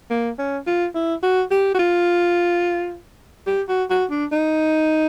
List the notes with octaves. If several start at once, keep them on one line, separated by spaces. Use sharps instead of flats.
A#3
C#4
F4
E4
F#4
G4
F#4
F4
G4
F#4
F#4
D4
D#4